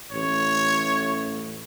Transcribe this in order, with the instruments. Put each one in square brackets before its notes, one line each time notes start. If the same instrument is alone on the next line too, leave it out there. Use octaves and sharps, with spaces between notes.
[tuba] A1 [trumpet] C#5